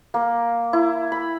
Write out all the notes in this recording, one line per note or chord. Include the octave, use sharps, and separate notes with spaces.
A#3
E4
B5